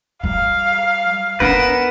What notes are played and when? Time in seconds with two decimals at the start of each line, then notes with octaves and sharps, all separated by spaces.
0.24 G3 F5
1.40 B3 D4 D#4 A#4 B4 F#5 E7